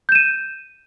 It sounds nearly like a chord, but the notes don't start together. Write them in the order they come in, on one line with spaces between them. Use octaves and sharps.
G6 E7 D#7